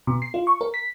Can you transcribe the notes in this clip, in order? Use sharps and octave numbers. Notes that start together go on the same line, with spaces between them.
B2
C7
F4
C#6
A#4
B6